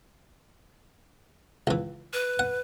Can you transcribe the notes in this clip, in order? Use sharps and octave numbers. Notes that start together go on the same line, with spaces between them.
C#2 E3
B4
F#5